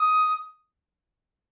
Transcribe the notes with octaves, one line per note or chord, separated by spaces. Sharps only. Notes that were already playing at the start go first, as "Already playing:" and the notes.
Already playing: D#6